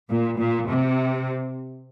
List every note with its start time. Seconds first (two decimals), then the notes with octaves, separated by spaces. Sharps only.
0.09 A#2
0.38 A#2
0.68 C3